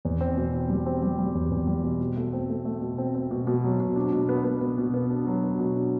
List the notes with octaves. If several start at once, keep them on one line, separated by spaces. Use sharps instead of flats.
E2
C4
B2
C4
G3
C4
G3
G3
E2
E2
G3
B2
B2
A3
C4
A3
A3
B2
C4
C4
B2
B2
F#3
B2
D4
B2
B3
B3
B2
B2
B3
D4
F#3
B3
B2
D4